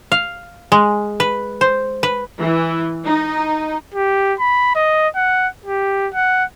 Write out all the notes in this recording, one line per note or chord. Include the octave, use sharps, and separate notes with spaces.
F5
G#3
B4
C5
B4
E3
D#4
G4
B5
D#5
F#5
G4
F#5